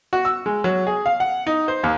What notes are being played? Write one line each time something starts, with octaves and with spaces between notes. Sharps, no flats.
F#4
E6
G#3
F#3
G#4
F5
F#5
D#4
C5
D#2